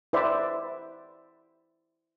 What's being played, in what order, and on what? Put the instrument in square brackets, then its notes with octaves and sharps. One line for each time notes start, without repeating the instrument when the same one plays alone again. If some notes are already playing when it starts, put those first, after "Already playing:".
[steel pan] E4 B4 C5 D5 E5